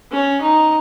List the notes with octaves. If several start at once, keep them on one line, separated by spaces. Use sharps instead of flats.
C#4
D#4